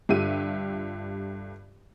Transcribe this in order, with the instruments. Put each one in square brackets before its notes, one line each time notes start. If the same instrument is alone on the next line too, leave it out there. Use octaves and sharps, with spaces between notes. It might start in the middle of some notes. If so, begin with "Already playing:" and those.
[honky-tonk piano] G2 D3 F4 G4 E5 D#7